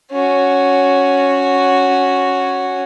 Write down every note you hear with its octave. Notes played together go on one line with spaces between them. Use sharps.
C#4 F#4